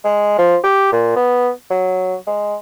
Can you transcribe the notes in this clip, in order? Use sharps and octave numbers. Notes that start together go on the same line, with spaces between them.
G#3
F3
G4
A#2
B3
F#3
G#3